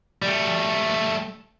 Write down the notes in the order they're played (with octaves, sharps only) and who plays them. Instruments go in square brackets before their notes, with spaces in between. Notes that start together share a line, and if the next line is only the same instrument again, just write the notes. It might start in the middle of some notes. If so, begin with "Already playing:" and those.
[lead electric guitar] G3 A3